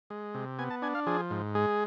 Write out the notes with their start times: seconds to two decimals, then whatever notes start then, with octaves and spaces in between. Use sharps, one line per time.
0.10 G#3
0.35 C3
0.59 B3 G#5
0.70 A5
0.82 D4 G#5
0.95 F5
1.06 F3 G#4
1.30 G#2
1.55 G#3 G#4